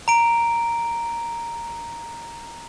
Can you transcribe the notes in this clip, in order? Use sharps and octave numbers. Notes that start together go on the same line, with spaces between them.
A#5 D7